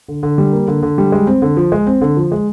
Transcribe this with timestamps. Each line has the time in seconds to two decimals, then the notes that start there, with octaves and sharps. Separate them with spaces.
0.08 D3
0.23 D3
0.38 G3
0.53 A#3
0.68 D3
0.83 D3
0.98 G3
1.12 G#3
1.27 C4
1.42 D3
1.57 F3
1.72 G#3
1.87 C4
2.01 D3
2.17 F3
2.32 G#3